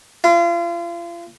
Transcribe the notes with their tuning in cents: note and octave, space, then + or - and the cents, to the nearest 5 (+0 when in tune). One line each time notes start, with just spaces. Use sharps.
F4 -35